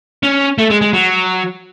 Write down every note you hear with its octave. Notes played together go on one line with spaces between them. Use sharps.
C#4
A3
G#3
G#3
F#3